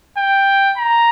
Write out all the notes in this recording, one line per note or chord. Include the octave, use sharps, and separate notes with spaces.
G5
A#5